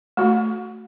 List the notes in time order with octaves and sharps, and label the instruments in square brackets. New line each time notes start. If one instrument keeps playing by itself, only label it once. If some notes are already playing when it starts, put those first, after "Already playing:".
[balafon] A3 F#4